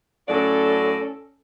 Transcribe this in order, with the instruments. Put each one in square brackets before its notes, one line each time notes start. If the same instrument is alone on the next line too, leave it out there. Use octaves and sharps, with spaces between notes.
[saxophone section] A2 F#3 D5 [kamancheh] C#4 A4